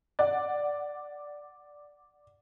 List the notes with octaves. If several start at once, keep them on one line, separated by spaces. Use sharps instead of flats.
D5 F#5